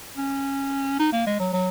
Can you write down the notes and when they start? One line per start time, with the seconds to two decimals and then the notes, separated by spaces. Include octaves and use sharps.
0.17 C#4
0.99 D#4
1.12 A#3
1.26 G#3
1.40 F#3
1.53 F#3